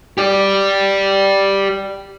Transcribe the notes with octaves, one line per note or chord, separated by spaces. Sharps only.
G4 D5